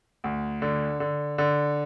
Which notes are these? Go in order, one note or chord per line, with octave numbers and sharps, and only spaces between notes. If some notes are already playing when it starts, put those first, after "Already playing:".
D2
D3
D3
D3